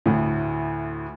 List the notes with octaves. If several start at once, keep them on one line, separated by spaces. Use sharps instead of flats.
D2 A2